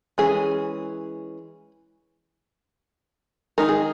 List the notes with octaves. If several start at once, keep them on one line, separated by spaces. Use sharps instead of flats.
E3 G#3 C#4 G#4
D#3 G#3 D#4 A#4
G#4